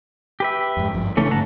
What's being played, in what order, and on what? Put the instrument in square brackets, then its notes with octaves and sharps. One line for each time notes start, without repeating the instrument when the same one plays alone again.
[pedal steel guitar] G4 B4 E5
[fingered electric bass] F2 G#2
G#1 G2 F3
[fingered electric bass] C#3 D4 [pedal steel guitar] E3 A3 C#4
[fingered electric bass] G#2 D3 [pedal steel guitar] F#5 A5 A#5